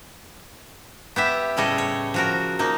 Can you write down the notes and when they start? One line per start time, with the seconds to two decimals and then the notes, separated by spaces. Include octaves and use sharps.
1.16 B3 G4 E5
1.57 A2 C#3 G3 A4 C#5 D#5
1.78 C#5
2.14 F3 F#4 A#4
2.59 F3 A#3 D#4